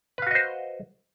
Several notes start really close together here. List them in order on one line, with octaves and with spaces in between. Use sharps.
B4 F5 F#4 D#5 C5